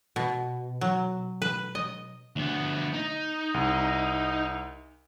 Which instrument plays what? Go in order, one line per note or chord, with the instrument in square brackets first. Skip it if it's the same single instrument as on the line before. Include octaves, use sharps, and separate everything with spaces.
[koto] B2
F#3
B4
D#5
[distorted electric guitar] D2 B3
D#4
[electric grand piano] C2